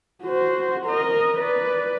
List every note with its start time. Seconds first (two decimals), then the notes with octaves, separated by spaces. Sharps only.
0.24 F#4 C5
0.86 A#4 D#5
1.39 B4 D5